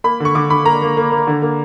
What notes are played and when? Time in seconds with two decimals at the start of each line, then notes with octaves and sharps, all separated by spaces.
0.04 A#3 B5
0.20 D3 C#6
0.35 D3 D6
0.50 D3 B5
0.66 A#3 A#5
0.82 A#3
0.97 A#3
1.12 A#3
1.27 D3
1.42 A#3